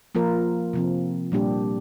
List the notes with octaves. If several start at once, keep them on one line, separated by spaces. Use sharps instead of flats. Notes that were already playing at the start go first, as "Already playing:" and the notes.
F3 A#3 F4 A#4
C3 F3 C4
A#2 G3 A#3 D4 G4